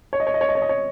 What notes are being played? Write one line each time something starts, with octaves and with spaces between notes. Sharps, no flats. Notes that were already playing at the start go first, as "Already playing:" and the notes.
C#5
D#5
C#5
D#5
C#5
D#5
C#5
D#5
C#5